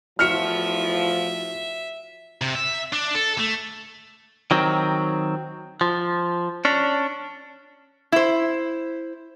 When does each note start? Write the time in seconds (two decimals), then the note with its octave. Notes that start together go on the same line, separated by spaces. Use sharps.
0.19 E2 A2 F3 E4 F#4 E5 F6 C#7
2.41 C3
2.55 E5
2.93 D4
3.15 A4
3.38 A3
4.51 D#3 F#3 C4
5.81 F3
6.65 C#4 D4
8.12 E4 C5